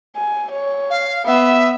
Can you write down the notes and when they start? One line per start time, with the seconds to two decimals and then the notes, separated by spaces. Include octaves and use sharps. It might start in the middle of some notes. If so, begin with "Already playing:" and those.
0.16 G#5
0.52 C#5
0.90 F5
1.26 B3 E5